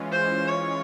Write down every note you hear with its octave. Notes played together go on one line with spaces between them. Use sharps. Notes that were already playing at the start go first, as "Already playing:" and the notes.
Already playing: E3 G#3 C#4 F4
C5
C#5